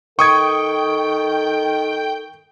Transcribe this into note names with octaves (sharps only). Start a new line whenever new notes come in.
D#3 A4 G5 C#6 D#6 G#6